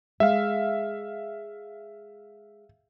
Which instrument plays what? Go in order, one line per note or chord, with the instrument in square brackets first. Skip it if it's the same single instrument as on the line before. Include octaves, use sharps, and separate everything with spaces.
[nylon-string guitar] G#3 [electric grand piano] E5 F5